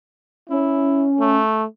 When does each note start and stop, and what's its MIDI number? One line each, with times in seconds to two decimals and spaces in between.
0.50 1.39 61
0.50 1.06 64
1.20 1.65 57